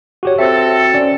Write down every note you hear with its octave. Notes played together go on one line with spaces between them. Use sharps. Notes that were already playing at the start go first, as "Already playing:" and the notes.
F#4 G4 C#5
C4 F#4 A4 E5
C#4 D5